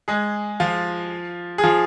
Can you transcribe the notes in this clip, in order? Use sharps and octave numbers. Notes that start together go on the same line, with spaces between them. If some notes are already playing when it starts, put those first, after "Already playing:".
G#3 G#4
F3 F4
G#4
F3 F4